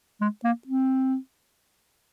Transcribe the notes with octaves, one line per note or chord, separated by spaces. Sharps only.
G#3
A#3
C4